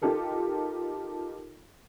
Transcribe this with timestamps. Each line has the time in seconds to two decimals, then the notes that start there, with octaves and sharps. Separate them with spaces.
0.02 D#4 F4 G4 A4 A#4